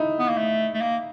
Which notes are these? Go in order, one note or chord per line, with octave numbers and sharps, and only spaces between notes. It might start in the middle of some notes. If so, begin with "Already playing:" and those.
Already playing: D#4 E4
B3
A#3
A3
A3
A#3